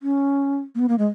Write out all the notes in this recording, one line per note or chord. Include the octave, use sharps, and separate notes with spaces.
C#4
A#3
B3
A#3
G#3